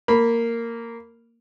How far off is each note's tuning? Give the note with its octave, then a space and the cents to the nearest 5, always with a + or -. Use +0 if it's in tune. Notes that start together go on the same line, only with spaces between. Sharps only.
A#3 -10 B5 +0